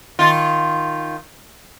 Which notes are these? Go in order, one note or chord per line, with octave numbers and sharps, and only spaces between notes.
D#3 F4